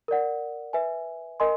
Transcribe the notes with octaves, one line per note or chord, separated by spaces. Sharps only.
A#4 D5 F#5
B4 E5 G#5
A#4 D#5 G#5 C6